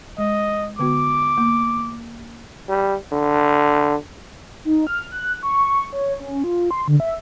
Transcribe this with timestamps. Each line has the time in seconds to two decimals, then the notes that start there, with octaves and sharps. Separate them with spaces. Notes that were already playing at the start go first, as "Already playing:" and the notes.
0.18 G#3 D#5
0.79 D3 B3 F#4 D6
1.38 A#3
2.69 G3
3.12 D3
4.65 D#4
4.87 F6
5.12 F#6
5.43 C#6
5.93 C#5
6.20 C#4
6.44 F4
6.71 C6
6.88 D3
7.00 E5